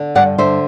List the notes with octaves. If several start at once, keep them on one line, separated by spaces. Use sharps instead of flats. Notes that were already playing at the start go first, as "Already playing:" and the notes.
Already playing: D3
G2 D5 F#5
D3 C5 E5